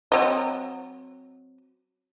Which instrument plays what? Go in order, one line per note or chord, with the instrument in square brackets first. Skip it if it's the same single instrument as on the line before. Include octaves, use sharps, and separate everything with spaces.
[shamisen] F#3 C4 D#5